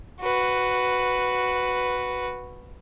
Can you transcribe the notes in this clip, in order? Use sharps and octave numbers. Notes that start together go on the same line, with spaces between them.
F#4 B4